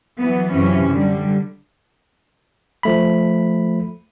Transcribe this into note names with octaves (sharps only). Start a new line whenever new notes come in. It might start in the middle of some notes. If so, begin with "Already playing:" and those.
E3 F#3 B3
F#2 C3 E3 F3 C#4
D3 G3
F3 A3 B5